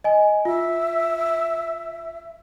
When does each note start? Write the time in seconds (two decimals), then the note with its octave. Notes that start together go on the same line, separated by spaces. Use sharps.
0.04 D#5 G#5
0.45 F4 E5